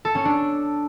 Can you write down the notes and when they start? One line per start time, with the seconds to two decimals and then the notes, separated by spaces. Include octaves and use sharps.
0.05 A4
0.15 C#4
0.25 D4